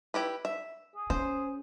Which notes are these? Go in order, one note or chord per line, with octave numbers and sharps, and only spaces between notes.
E4 G4 B4
E5
G#4
C#4 C5